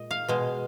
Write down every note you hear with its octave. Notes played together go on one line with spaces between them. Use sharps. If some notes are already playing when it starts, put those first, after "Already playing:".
Already playing: A#2 G#3 D#5
F5
B2 G#3